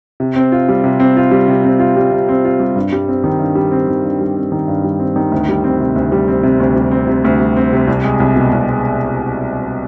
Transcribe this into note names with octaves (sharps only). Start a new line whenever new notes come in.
C3
C4
F4
G3
C3
C4
F4
G3
C3
C4
F4
G3
C3
C4
F4
G3
G2
G3
C4
D#3
G2
G3
C4
D#3
G2
G3
C4
D#3
G2
G3
C4
D#3
D2
G3
C4
C3
D2
G3
C4
C3
D2
G3
C4
C3
D2
G3
C4
C3
C2
G#3
C2
B2
C2
G#3